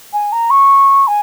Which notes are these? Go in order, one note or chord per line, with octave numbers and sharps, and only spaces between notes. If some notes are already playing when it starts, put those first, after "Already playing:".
G#5
A#5
C#6
G#5